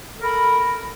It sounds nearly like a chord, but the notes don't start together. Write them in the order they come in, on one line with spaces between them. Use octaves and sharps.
A4 A#4 B5